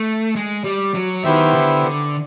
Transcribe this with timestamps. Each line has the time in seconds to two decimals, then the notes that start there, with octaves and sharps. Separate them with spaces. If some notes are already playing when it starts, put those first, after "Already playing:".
Already playing: A3
0.36 G#3
0.64 G3
0.94 F#3
1.24 D#3 B3 E4 G4 C5 E5
1.54 D3
1.84 D3